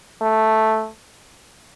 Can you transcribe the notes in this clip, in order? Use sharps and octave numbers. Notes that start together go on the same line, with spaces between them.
A3